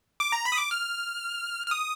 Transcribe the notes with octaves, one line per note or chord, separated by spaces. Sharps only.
D6
A#5
B5
D#6
D6
F6
F6
D#6